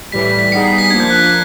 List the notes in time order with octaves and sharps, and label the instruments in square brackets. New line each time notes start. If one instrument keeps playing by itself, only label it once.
[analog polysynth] A2 E3 G3 [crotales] B6
[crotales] B6
B6
[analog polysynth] G3 B3 D#4 G#4 [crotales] C#7
[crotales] C7
B6
[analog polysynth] F3 A#3 D4 [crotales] G#6
[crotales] G6
F#6